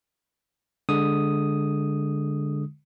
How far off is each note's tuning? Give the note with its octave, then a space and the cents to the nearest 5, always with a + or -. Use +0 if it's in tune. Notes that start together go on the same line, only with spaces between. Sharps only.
D3 +0 G#3 -10 D#6 +0